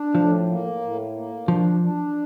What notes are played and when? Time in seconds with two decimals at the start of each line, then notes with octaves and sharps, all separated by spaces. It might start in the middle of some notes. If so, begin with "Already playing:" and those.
Already playing: D4
0.15 A2 F3
0.48 A#3
0.81 A2
1.15 A#3
1.47 F3 D4
1.81 D4